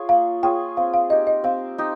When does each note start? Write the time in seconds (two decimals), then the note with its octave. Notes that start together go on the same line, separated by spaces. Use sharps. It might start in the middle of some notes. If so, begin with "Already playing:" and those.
Already playing: F4 G#4 C#5
0.09 A#3 F5
0.43 F4 G#4 C#5 G5
0.77 C4 F5
0.94 F5
1.10 D#4 G4 D#5
1.27 D#5
1.44 C4 F5
1.78 D#4 G4